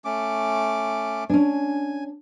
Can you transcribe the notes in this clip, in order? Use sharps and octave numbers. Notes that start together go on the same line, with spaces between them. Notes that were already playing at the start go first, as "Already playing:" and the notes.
A3 C#4 D6
C#4 D4 G#5